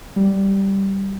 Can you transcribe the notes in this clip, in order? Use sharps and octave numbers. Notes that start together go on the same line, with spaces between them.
G3